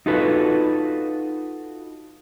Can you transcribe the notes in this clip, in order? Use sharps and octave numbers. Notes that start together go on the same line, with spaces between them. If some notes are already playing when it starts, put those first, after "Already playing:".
D#4 F4 F#4 A4 B4